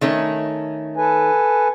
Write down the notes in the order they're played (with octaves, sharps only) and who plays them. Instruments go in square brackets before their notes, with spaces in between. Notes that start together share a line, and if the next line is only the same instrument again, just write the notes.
[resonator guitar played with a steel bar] D#3 A3 C#4
[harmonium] A4 B4 G#5